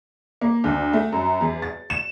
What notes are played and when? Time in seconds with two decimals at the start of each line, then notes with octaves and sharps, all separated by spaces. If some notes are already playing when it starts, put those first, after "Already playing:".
0.41 A#3
0.64 D2
0.93 A3
1.12 F#2
1.41 E2
1.62 A6
1.90 E7